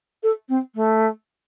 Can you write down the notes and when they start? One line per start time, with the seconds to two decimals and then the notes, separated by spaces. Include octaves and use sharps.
0.23 A4
0.49 C4
0.75 A3